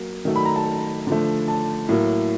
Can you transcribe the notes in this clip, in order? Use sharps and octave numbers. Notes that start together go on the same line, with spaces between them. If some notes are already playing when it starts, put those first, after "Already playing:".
Already playing: F#3 A#3
D#3 F#3 A3
B5
A#5
A5
D3 F3 A3
A5
A2 F#3 A#3